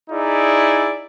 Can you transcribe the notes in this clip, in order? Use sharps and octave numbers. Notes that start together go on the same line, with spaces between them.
D#4 E4 G#4 D5